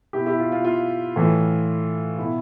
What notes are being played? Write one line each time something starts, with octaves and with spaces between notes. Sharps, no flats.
B2 E4 G4
E4 G4
F4
F4
F4
A2 E3
B2 E4